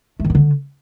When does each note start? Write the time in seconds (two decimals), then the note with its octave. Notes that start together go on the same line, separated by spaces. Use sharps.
0.19 A3
0.25 D#3
0.30 B3
0.35 D3